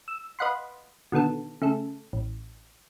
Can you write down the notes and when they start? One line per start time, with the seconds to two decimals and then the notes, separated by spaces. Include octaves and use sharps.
0.08 E6
0.39 B4 D#5 F5 F#5 B5 C6
1.12 B2 D3 D#3 B3 A4
1.62 C#3 A3 A4
2.13 A1